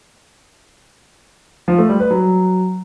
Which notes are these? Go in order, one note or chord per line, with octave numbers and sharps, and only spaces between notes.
F3
A3
G3
B4
F#3